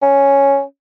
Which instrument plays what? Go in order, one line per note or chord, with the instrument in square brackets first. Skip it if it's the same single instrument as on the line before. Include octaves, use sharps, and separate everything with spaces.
[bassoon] C#4